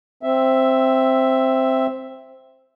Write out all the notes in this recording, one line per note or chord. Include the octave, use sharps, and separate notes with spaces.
C4 E5